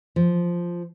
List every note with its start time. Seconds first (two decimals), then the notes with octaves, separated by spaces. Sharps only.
0.16 F3